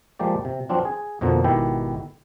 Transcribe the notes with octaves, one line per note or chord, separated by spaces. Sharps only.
F3 G#3 A#3 G4 D5
C3
F3 F#3 C4 D4 F4
G#4
F2 B2 D3 F3 A#3
G#1 B2 D#3 E4 G4 G5